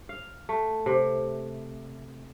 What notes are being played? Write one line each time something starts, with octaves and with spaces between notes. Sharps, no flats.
F5
A3
C3